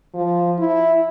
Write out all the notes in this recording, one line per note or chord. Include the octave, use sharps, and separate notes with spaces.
F3
E4